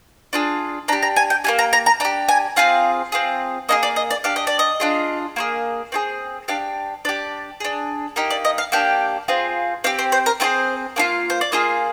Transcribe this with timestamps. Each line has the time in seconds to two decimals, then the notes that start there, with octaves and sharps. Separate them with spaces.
0.33 D4 F4 G#4
0.88 D4 A#5
0.93 G4
1.03 A#5
1.16 G#5
1.30 G5
1.44 A#3 D4 G4 G#5
1.59 A#5
1.73 A#5
1.86 A#5
2.00 D4 G4 A#5
2.28 G#5
2.56 C4 F4 G#4 F5
3.12 C4 F4 G#4
3.69 A#3 D#4 G#4 D#5
3.83 D5
3.96 D#5
4.11 D5
4.24 D4 G4 F5
4.36 D#5
4.47 D5
4.59 D#5
4.80 D4 F4 G#4
5.36 A#3 F4 G#4
5.92 C4 F4 G#4
6.48 D4 G4 F5
7.05 D4 G4 D5
7.60 D4 G#4
8.16 A#3 D#4 G4
8.30 D5
8.45 D#5
8.58 F5
8.72 A#3 D4 G4 G5
9.28 C4 F4 G#4
9.84 C4 G4 F5
9.99 C5
10.12 C5
10.26 A#4
10.40 C4 F4 G#4 C5
10.96 A#3 D4 F4
11.30 C5
11.41 D5
11.52 A#3 F4 G#4 D#5